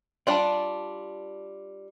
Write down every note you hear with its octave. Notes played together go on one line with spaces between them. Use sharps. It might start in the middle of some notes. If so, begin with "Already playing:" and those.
G3 D4 F4 D5 A5